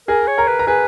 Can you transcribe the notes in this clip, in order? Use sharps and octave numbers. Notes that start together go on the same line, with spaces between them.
G#4 A#4 G#5
C#5
A#4 A#5
B4
A#5
G#4 B4 G#5